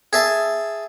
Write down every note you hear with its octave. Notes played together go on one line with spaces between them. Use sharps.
G#4 E5 A5